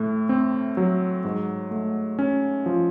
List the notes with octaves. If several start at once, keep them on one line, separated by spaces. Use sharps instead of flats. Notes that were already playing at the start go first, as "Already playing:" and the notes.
Already playing: A2 A3
C4
F#3
G#2
A3
C#4
F3